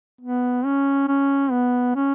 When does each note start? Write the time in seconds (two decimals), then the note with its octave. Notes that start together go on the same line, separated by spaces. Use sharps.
0.21 B3
0.65 C#4
1.08 C#4
1.51 B3
1.95 C#4